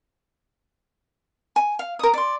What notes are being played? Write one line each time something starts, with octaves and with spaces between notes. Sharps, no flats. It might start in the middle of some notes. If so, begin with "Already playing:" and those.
G#5
F5
A#4 D#6
D5 C6